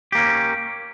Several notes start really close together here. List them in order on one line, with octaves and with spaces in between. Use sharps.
G4 A#3 C#4